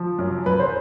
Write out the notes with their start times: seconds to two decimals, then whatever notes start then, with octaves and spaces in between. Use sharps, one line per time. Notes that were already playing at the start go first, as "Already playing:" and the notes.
Already playing: F3
0.19 F#2
0.46 F#2 B4
0.60 C5